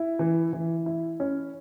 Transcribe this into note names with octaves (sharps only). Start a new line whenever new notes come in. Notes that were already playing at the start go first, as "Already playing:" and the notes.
Already playing: E4
E3
E3
E4
C#4